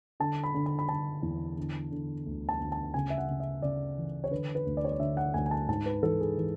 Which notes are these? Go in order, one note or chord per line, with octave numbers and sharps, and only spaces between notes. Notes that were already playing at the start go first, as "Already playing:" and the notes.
D3 A5
B5
D3
B5
B5
D3 A5
E2
D3
D3
D2
A5
D2
A5
C#3 G#5
E5
F#5
C#3
E5
C#3 D5
E3
C#5
D3 B4
B4
D2
D5
C#5
D5
D3 E5
F#5
D2 G#5
G#5
A5
G#2 A5
B4
E3 A4
G#4
E3